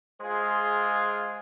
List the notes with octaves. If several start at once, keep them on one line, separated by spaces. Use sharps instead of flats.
G#3 F4 G#4 C5